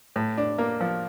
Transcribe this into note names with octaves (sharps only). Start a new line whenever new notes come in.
A2
D4
A#3
F3